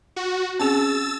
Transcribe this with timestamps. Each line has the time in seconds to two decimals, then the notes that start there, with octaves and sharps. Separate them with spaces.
0.16 F#4
0.59 C4 C#4 G#4 E6 A6